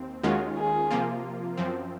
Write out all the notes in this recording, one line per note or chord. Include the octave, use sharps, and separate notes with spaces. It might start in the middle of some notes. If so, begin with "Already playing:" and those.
Already playing: D#2 C4
D#2 D#3 G#3 C#4 F4 F#4
G#4
C3 F3 A#3 F4
F#2 F3 C4